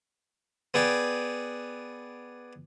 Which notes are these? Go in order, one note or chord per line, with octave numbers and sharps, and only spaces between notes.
B3 G#4 D5 G5